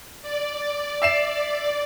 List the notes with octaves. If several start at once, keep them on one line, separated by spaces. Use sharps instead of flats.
D5
E5 C7 E7